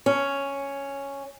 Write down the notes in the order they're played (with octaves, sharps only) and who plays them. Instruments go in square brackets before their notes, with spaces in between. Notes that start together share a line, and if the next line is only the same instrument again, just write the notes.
[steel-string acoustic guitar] C#4